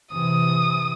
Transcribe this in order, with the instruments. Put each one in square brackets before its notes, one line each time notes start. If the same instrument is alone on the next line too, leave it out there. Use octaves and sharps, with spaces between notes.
[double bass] C3 E3 [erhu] D#6